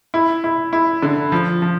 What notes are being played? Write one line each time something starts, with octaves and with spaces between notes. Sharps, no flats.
E4
E4
E4
D3
F3
F3